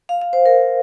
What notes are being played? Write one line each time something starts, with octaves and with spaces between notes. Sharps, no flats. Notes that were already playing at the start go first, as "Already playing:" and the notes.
F5
F5
C5
A#4